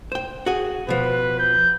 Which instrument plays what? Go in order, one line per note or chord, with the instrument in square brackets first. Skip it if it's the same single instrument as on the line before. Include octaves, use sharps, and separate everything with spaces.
[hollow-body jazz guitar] C5 G5
F#4 G#4
[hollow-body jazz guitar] B2 F3 [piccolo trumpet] B4
[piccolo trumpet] G6